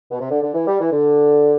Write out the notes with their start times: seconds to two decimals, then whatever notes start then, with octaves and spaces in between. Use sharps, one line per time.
0.11 B2
0.20 C3
0.30 D3
0.42 D3
0.54 E3
0.67 G3
0.80 E3
0.91 D3